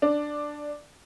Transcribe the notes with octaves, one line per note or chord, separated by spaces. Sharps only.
D4